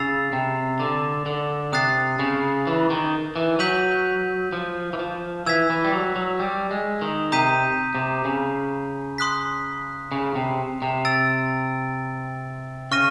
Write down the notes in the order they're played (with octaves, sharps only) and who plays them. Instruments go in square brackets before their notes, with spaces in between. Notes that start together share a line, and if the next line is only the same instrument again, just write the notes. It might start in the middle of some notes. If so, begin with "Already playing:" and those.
Already playing: [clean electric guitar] C#3 [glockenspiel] E6 A6 C7 F7
[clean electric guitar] C3
D3
D3
[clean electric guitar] C3 [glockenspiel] D#6 F#6 A6 C7
[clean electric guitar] C#3
E3
D#3
E3
[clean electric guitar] F#3 [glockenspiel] G6 B6 D#7 F#7
[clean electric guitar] F3
E3
F3
[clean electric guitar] E3 [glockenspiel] E6 G#6 B6
[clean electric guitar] E3
G3
F#3
F#3
G3
G#3
D#3
[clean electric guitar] C3 [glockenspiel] A#5 D#6 G6 B6 D#7
[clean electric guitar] C3
C#3
[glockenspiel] C6 D#6 F#6 B6
[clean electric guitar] C#3
C3
C3
[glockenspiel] E6 A6 D7
[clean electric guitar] C#3 [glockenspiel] C#6 F6 A#6 D#7